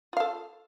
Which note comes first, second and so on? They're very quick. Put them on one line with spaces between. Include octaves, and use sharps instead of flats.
F4 F5 A4